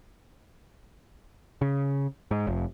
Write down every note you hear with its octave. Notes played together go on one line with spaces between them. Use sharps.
C#3
G#2
F1